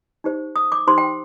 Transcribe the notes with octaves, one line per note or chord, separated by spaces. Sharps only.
D#4 G4 C5
D#6
D6
D#4 G4 C5 C6
G5